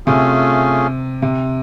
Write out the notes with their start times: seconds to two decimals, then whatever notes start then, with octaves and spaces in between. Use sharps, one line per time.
0.06 C3 A3 C#4 F4 G#4
1.22 C3